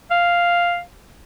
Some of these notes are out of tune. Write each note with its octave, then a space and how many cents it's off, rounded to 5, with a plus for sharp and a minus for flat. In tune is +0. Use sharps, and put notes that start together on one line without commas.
F5 +0